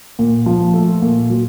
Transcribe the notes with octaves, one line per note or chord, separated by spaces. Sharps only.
A#2
F3
A3
A#2
F#3